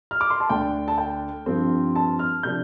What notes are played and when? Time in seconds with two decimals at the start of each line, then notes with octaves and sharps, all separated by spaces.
0.11 F6
0.21 D6
0.30 C6
0.40 A5
0.50 D2 D3 A3 D4 G5
0.88 A5
0.98 G5
1.46 G2 F3 C4
1.96 A5
2.19 F6
2.43 C3 F3 D4 G6